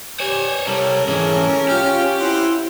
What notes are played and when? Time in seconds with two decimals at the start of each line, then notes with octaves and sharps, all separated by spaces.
0.20 G4 C5 C#5 G#5
0.67 C2 G3 A4 A#4 C#5
1.08 G#2 E3 C#4 G#4
1.69 F4 G4 F6
2.19 C4 E4 C5 F#5